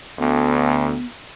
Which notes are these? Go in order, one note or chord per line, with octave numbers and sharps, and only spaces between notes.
D2 B3